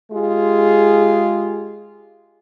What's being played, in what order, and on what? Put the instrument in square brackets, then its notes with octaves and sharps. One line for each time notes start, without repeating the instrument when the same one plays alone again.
[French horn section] G#3 F4 G4 G#4